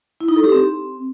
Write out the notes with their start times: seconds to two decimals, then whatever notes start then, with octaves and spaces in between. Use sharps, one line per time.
0.21 E4
0.28 D#4
0.36 A4
0.44 G4
0.52 C4